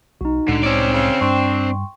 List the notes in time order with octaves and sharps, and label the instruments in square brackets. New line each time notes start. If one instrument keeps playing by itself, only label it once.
[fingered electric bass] B1 [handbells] D#4 F#4
[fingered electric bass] C2 A2 G#3 [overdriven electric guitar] D3
[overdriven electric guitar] C4 D5 [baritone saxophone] C#4
[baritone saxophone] C#3
[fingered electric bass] G2 [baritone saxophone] D4 [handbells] G5 C6 C#6